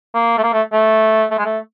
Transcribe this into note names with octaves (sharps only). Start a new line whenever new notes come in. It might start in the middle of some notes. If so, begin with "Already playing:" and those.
A#3
A3
A#3
A3
A3
A3
G#3
A3